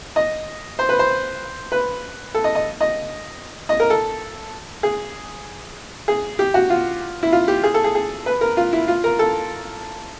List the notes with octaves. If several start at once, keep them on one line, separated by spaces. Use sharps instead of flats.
D#5
C5
B4
C5
B4
A4
D#5
D#5
D#5
D#5
A#4
A4
G#4
G#4
G4
F#4
F4
E4
F4
G4
G#4
A4
G#4
G#4
B4
A#4
F4
E4
F4
A#4
A4